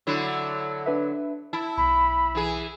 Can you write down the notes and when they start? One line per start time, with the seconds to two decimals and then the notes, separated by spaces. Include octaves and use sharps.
0.07 D3 F#3 E4
0.86 D4 B4 E5
1.53 E4 A5
1.77 B1 B5
2.35 E3 G#4